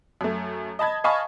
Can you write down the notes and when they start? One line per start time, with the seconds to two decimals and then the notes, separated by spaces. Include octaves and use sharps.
0.21 F#2 A3
0.79 D#5 A5 B5 G#6
1.04 D#5 F5 G#5 A5 B5 C#6